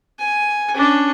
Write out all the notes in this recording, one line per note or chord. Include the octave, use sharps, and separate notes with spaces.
G#5
C#4 D4